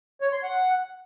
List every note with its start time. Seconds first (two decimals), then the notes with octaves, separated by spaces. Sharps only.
0.21 C#5
0.32 C6
0.43 F#5